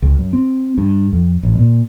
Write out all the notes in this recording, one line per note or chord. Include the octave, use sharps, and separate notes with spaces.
C#2
F#2
C4
G2
F2
A1
A#2